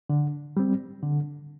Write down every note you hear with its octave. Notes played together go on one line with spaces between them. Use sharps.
D3
G3 C4
D3